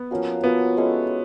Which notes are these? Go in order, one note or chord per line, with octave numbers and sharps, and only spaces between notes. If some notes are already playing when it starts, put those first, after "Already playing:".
Already playing: B3
F3 A#3 C#4 F#4
F3 A#3 B3 C#4 F#4
G#3 C#4 E4 A4